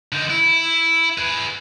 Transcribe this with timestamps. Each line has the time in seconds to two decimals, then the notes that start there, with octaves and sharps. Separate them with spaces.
0.12 D3 D#4
0.30 E4
1.18 G#4 B4